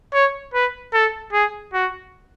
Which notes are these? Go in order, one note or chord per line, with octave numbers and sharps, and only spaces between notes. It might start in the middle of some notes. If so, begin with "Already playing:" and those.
C#5
B4
A4
G#4
F#4